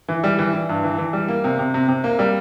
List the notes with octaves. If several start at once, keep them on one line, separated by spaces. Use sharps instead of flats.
E3
G3
E3
E3
G2
E3
E3
G3
A#3
C3
C3
C3
C3
A#3
G3